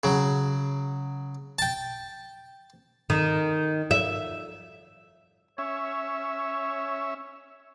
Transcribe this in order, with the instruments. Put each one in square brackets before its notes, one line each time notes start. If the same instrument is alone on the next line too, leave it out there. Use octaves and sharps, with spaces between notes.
[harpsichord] C#3 F#3
G5 A5
[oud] D#3
E5
[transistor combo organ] C#4 E5 [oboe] C#5